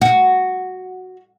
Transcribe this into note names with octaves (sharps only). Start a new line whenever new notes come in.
F#4